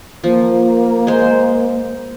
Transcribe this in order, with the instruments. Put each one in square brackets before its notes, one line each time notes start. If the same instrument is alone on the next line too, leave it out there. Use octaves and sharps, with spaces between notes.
[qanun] F3 [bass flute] A#3
[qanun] G#3 C5